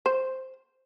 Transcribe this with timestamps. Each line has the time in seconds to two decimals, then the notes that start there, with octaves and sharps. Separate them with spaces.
0.06 C5